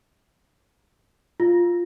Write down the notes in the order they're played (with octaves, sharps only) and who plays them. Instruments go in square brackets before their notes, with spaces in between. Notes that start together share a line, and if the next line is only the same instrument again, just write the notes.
[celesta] F4